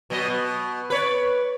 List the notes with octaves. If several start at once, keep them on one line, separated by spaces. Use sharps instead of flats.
B2 F#3 D#5
B2
B4 C#5 D5